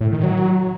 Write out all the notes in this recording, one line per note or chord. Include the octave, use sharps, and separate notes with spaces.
A2
D#3
F#3